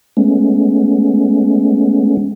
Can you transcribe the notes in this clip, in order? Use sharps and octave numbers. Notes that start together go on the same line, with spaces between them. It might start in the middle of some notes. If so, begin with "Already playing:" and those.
G#3 A3 B3 C#4